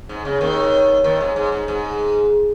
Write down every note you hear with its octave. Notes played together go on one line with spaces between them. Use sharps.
G#2
C#3
D#2 D#3
D#2 D#3
G#2
G#2
G#2
G#2